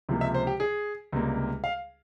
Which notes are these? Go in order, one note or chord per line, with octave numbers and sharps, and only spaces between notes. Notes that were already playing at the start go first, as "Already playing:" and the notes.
C#2 C3 F3 A#3
E5
C5
G4
G#4
C#2 C3 G3 A#3
F5